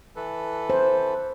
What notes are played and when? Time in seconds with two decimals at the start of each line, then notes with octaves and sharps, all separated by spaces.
0.16 E3 A4 B4
0.70 C5